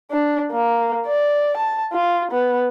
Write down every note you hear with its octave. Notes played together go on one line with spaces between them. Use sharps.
D4
A#3
D5
A5
F4
B3